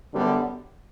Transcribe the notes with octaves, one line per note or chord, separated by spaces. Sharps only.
F#2 D3 G3 B3